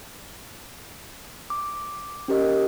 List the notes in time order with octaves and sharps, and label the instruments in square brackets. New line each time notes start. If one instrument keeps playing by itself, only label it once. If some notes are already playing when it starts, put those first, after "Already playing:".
[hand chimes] D6
C#4 G4 A#4 D#5